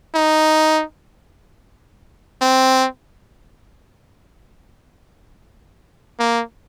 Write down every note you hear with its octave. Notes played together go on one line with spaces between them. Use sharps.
D#4
C4
A#3